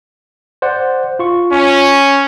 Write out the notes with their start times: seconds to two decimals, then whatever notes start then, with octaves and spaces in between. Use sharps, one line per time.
0.62 C5 D5 F#5
1.19 F4 C#6
1.52 C#4